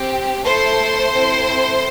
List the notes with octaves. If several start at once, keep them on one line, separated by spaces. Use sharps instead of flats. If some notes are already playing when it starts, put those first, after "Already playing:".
Already playing: C4 G4
A3 E4 A4 C5 C6
C4 E4 A4